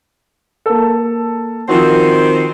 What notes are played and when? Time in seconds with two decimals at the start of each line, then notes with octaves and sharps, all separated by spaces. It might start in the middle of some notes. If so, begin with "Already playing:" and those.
0.66 A#3 A4
1.69 D#3 F3 C4 F#4